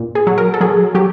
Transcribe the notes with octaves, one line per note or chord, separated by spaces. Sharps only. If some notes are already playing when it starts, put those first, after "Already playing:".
Already playing: A#2
G#4
F#3
A#4
A4
F#3 G#4
F#3 G4